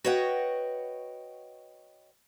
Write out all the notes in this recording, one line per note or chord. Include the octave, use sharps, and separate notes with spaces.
F#4 B4 C#5 D#5 F#5 G5